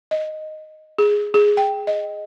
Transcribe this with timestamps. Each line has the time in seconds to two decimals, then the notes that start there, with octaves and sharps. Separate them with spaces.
0.11 D#5
0.99 G#4
1.34 G#4
1.57 G5
1.87 D#5